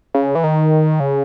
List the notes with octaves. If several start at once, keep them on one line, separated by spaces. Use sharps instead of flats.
C#3
E3
D#3
C#3